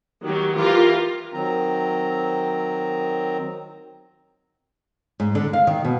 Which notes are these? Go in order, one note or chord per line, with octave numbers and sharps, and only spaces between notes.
D#3 F#3 G4
E3 F4 G4 A#4
D#3 F#3 C4 A#5
G#2
D3
F5
D#3
B2